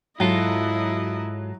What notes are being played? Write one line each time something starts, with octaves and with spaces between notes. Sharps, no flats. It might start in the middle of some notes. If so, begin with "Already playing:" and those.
G#2 F#3 E4 F4 A4 D#5